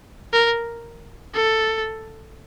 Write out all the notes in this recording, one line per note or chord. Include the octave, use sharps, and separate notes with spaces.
A#4
A4